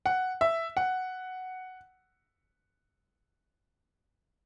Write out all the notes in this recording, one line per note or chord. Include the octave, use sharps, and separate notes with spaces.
F#5
E5
F#5